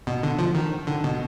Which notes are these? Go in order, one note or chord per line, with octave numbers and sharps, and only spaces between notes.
B2
D3
F3
D#3
D3
B2